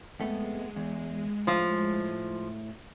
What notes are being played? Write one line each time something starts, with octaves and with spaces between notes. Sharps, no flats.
F2 G#3 A3 B3
E2
A2 F3 C5 F5